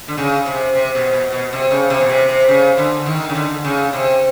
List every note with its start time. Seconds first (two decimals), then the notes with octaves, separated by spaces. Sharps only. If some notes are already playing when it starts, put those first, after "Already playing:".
0.08 D3
0.18 C#3
0.46 C3
0.75 C3
0.95 B2
1.13 B2
1.32 B2
1.53 C3
1.71 C#3
1.90 C3
2.00 B2
2.09 C3
2.29 C3
2.48 C#3
2.77 D3
3.06 D#3
3.29 C#3
3.35 D3
3.64 C#3
3.93 C3